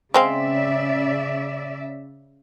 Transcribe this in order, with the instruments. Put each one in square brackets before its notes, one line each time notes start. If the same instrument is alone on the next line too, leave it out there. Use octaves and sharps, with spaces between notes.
[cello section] C#3 D5 E5 [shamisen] G#3 C4 F5